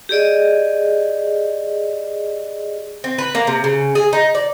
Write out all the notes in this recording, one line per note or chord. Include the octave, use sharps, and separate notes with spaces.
G4 G#4 D5 D#5
C4
B4
A#3
C3
C#3
G#4
D#4
D5